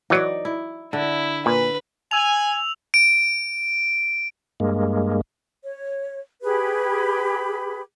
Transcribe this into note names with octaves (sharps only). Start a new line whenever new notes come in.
E3 F#3 D#4 D5
E4
D3 E4
A#2 B4
G#5 E6 F7
D7
G2 G#3 A#3
C#5
G4 G#4 B4 B5